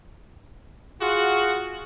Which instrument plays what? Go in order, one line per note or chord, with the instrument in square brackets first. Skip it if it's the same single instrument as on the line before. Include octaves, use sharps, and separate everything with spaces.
[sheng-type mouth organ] F4 F#5 [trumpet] F#4 [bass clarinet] G#4